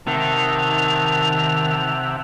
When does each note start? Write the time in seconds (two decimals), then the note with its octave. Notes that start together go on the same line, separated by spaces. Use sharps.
0.07 C3 D#3 E5 F#5 A5 F7